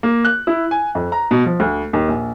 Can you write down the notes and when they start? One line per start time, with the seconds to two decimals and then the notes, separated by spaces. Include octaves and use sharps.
0.03 A#3
0.25 F#6
0.47 E4
0.71 G#5
0.95 F2
1.12 A#5
1.31 B2
1.46 F3
1.60 D2
1.93 D#2
2.08 A#1